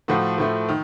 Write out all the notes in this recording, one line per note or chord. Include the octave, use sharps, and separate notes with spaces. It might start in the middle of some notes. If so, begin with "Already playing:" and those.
A2 F3 A3 F#4
A2 F3 A3
D#3